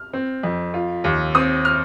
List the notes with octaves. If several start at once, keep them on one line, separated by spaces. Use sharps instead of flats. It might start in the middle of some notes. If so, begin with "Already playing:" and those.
Already playing: F6
C4
F2
F4
D#2
C4 D#6
F6